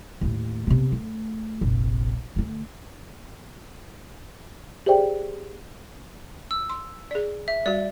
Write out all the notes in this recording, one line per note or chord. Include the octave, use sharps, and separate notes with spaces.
D#2 A2
C3 B3
A3
F1 A#1
D3 A3
G4 G#4 C5 D5 E5 G5
E6
C6
G#4 D5
E5
G3 F#4 D5